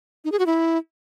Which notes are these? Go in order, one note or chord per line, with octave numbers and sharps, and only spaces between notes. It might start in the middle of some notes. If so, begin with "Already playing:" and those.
D#4
G#4
F#4
E4